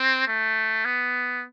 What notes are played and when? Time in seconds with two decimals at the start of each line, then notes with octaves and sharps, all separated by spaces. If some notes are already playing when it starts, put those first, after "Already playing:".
Already playing: C4
0.28 A3
0.85 B3